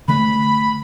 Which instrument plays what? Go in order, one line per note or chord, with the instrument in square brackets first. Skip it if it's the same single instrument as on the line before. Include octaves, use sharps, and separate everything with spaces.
[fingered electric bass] D3 A3 [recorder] B5